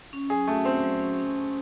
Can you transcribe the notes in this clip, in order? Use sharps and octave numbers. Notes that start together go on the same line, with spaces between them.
C#4
F#3 G#4
A3 F#4
C4 C#4
F#3
C#4
C#4
C#4